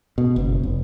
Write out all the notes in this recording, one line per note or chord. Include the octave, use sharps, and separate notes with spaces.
B2
F#1
F1